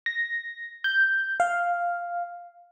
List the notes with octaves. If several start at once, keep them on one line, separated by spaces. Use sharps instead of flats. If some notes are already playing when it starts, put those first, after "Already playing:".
A#6
G6
F5